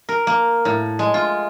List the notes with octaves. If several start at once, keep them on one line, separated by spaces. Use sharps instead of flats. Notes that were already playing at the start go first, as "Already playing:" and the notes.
A#4
A#3
A2
G#3
F4